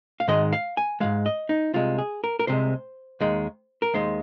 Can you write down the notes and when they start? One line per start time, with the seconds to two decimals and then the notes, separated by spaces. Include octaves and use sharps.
0.20 F5
0.28 G#2 D#3 G#3 D#5
0.53 F5
0.77 G#5
1.00 G#2 D#3 G#3 F5
1.26 D#5
1.49 D#4
1.74 C2 C3 G#3 F4
1.98 G#4
2.24 A#4
2.39 A#4
2.47 C2 C3 G#3 C5
3.20 D#2 D#3 G#3
3.82 A#4
3.94 D#2 D#3 G#3 C5